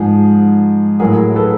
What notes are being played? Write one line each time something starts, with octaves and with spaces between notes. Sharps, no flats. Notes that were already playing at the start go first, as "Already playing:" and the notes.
Already playing: G#2 F3 G#4
A2 F#3 G#4 A#4
A4 B4